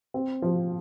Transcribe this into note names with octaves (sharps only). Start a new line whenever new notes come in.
C4
F3